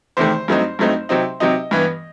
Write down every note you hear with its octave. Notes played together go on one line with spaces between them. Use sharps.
E2 C3 D#3 A3 C5
G2 F#3 A3 C4 D#4
G2 F#3 A3 C4 D#4
C3 F#3 C4 D#4
C3 F#3 C4 D#4 D#5
G2 E3 B3